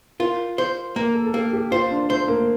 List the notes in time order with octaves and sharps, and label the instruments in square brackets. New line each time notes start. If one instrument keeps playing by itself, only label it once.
[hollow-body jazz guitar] F4 [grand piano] A#4
[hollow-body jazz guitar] C5
[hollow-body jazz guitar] A#3 [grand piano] A#4
[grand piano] A4
A4
[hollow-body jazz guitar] A#3 [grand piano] G4
[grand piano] G4
[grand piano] F4 [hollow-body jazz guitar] C5
[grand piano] D4
[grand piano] A3 [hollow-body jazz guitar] C5
[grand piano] A#3